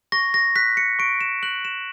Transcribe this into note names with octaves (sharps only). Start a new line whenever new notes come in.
C#6 A#6
A#6
F#6 B6
C#7
C#6 D7
E7
F#6 F#7
E7